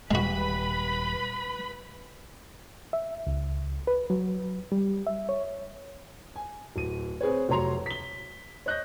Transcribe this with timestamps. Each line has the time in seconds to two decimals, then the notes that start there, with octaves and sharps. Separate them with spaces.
0.11 D#1 A#2 G3 G#3 F#4 B4 B5
2.93 E5
3.27 C#2
3.87 B4
4.10 F#3
4.72 G3
5.06 E5
5.29 C#5
6.36 G#5
6.76 D1 D#7
7.21 C4 G#4 B4 C#5
7.49 F1 F#3 C#5 A#5 C6 F7
7.86 B6 G7
8.66 C#5 D#5 F#6 G6 A#6